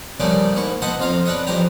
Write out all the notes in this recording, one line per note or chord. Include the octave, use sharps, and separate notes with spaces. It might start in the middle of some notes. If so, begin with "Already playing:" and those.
C#3 F3 G3 A3 A#3 D4
G#2 A#3 E4 C#6
A4 B4 C5 D#5 F#5
F2 F4 F5 A#5
D4 B4 C#5 D#5
F2 E3 G4 C5 A#5